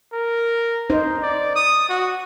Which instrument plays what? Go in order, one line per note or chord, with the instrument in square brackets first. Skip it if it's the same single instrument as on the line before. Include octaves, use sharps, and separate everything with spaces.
[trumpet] A#4
[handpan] D#4 C5
[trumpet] D5
D#6
F#4